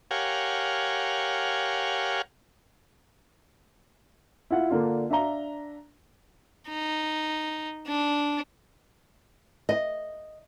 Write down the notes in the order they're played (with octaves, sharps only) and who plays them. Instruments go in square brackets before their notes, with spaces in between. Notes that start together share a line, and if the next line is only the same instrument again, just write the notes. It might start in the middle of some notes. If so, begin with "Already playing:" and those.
[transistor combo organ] G4 A#4 C#5 F5 F#5 G#5
[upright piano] E4 F4 F#5
D3 A#3 D4 F4
D4 E5 F5 A#5 G7
[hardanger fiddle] D#4
D4
[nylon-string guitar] D#5